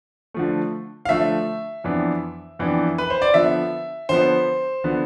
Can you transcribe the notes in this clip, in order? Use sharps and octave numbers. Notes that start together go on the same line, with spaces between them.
D3 F3 A3
F5
D3 F3 A3 E5
F2 E3 B3 D4
F2 E3 B3 D4
B4
C5
D5
D3 F3 B3 E5
D3 F3 B3 C5
D3 F3 B3